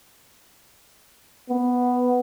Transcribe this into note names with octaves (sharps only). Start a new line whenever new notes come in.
B3